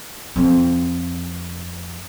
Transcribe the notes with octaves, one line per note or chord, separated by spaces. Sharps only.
F2 C4